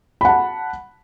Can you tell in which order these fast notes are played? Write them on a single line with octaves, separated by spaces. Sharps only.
B5 F#5 A5